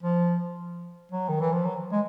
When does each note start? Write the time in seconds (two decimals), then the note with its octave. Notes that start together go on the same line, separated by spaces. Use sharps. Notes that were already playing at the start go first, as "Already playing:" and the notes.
0.03 F3
1.12 F#3
1.29 D#3
1.40 E3
1.52 F3
1.65 F#3
1.92 G#3